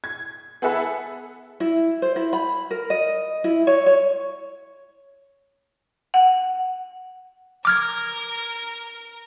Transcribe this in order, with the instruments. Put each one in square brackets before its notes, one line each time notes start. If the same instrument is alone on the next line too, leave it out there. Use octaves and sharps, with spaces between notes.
[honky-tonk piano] G#6
B3 G#4 A4 E5 F#5 B5
[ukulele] E4
C5
E4
B5
A#4
D#5
E4
C#5
C#5
[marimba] F#5
[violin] A#4 A#5 [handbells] D6 F6 G#6